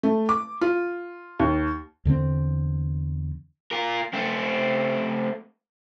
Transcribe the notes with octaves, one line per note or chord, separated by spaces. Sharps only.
A3
D6
F4
D#2
E2 D3 A3 C4
F4 A#4
A3 C4